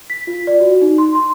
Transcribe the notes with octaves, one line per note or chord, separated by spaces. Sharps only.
B6
F4
D5
F#4
D#4
C6
C6